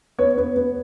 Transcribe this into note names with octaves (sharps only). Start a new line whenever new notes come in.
B3 C#5
B3
B3